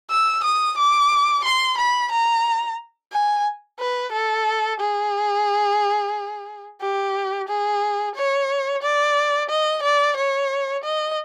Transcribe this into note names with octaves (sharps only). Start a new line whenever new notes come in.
E6
D#6
D6
C6
B5
A#5
G#5
B4
A4
G#4
G4
G#4
C#5
D5
D#5
D5
C#5
D#5